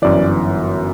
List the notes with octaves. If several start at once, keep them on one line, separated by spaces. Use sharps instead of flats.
G1 F#2 E3 D5